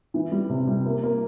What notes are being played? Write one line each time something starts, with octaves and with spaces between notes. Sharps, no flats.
E3
G3
C3
G3
A#3
A#3